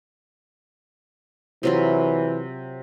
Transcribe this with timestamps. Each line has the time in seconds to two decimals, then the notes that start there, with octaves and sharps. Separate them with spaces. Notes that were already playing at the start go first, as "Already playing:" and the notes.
1.63 C3 E3 F#3 F4